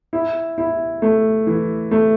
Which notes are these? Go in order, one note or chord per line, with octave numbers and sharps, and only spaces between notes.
E4
E4
A3
E3
A3